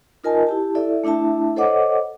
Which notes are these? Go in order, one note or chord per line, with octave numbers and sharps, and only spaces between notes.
D#4 F4 A#4 D#5 G#5 A5
E4 G4 A5
E4 A4 D5 E5
A3 D4 E4 E5 A5
A4 C5 C#5 D#5 F#5 D6